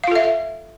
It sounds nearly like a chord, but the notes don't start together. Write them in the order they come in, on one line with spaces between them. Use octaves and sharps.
F5 F4 A4 E5